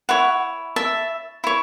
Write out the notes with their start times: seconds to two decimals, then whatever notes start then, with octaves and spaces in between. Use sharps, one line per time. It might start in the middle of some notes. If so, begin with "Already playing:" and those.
0.09 E4 C#5 F#5
0.76 E5 A5
1.44 E4 C#5